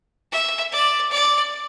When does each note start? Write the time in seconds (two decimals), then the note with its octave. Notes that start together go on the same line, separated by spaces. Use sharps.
0.31 E5
0.72 D5
1.11 D5